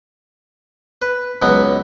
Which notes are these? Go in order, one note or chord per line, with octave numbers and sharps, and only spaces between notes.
B4
C#2 B2 F#3 B3